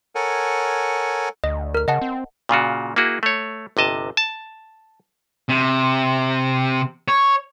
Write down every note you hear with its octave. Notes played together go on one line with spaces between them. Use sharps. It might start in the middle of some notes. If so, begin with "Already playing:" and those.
A4 A#4 C#5 F#5 G#5
D2 D#5
A#4 F6
C#3 D#5 F#5 A5
C4
A#2 C#3 F4 F#4
A#3 E4 F#4 G#4
A3 C#5
G1 C3 D#5 A5
A5
C3
C#5